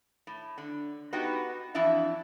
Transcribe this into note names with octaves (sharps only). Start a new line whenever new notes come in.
A2
D3
B3 D#4 F#4 G4
F2 E3 D4 E4 E5